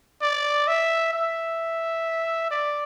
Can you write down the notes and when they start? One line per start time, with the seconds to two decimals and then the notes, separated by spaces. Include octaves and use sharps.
0.22 D5
0.67 E5
1.13 E5
2.51 D5